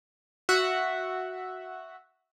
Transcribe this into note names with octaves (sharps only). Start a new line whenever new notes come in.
F#4 E5 F#5